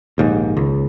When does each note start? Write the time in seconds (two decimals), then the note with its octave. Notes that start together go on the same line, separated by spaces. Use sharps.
0.18 A#1 D#2 G#2
0.57 C#2